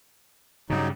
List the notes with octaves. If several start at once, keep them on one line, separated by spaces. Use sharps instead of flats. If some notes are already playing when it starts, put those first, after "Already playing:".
G2 C#3 F#3 D#4